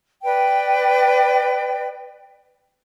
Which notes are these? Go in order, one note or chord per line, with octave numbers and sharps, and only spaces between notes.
B4 D5 G5